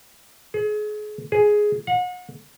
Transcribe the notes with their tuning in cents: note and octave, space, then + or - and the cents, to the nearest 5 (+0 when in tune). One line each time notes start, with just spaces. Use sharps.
G#4 +30
G#4 +5
F#5 -40